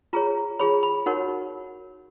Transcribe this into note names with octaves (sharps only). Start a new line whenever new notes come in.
F4 G#4 C#5 A#5
F4 G#4 C#5 B5
B5
D#4 F#4 A#4 C#5 F#5